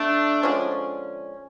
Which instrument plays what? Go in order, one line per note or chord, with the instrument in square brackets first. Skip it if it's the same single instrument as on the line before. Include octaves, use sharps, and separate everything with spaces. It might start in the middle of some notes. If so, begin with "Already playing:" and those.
Already playing: [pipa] D3 A3 [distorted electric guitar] D4
[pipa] D3 F3 G#3 C#4